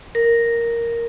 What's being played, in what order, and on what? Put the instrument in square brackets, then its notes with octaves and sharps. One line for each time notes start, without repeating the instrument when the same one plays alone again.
[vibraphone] A#4